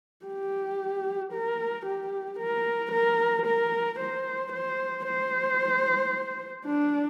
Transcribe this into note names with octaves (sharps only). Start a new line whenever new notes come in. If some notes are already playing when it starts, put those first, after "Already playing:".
G4
A#4
G4
A#4
A#4
A#4
C5
C5
C5
D4